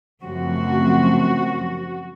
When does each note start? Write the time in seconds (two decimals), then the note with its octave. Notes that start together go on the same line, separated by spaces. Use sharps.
0.23 F#2 C#3 F3 A3 C4 F#4